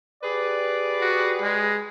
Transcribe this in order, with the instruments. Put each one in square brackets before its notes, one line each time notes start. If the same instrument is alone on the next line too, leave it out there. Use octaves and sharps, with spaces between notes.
[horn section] G4 G#4 B4 [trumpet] D5
[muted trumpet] F#4
G#3